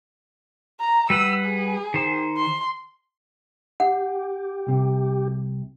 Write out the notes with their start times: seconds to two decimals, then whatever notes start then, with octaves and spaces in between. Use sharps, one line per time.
0.80 A#5
1.10 G3 B4 F#5 E6
1.44 G#4
1.94 D#3 C5
2.37 C6
3.80 G4 F#5
4.67 C2 C3